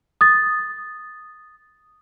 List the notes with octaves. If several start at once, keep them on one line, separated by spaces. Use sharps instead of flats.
D#6 A6